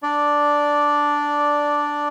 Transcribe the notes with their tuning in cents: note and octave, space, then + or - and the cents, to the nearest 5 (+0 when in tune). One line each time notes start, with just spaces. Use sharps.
D4 +0 D5 -5